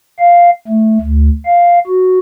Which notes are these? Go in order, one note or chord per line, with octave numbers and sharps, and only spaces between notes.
F5
A3
D2
F5
F#4